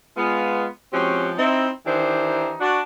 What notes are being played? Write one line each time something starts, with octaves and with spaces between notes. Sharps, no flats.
G#3 B3 F4
F3 G#3 C4 C#4 F#4 G4
C4 D#4 E4
D#3 E3 D4 D#4 G4 C5
D4 F#4